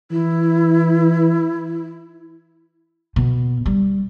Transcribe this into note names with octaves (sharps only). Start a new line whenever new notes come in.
E3 E4
B2
G3